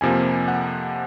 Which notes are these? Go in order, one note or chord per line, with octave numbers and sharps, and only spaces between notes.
F2 C3 F3 A#3 G#5
F#5